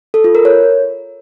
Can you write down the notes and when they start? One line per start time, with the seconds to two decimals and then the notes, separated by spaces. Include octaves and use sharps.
0.14 A4
0.24 F4
0.35 A#4
0.45 C#5